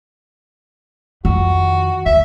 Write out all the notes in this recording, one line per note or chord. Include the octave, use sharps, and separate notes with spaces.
F2 D#3 F#4
D2 E5